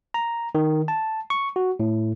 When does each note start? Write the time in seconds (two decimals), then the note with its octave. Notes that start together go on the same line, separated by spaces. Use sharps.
0.14 A#5
0.55 D#3
0.88 A5
1.30 C#6
1.56 F#4
1.80 A2